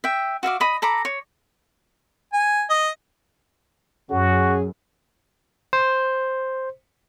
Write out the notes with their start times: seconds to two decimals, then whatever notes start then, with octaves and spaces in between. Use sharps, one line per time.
0.04 E5 G5
0.43 F#4 E5 F5 D6
0.60 D#5 B5 D#6
0.82 A4 A#5 B5 D6
1.05 C#5
2.33 G#5
2.70 D#5
4.11 F#2 C#4 F#4 G#4
5.73 C5